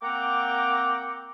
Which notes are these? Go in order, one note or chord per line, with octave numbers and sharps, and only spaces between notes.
A#3 C4 F#5 G5 A#5 D6